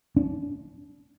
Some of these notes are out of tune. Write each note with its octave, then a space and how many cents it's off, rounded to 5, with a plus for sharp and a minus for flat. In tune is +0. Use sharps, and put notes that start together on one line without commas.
D4 -35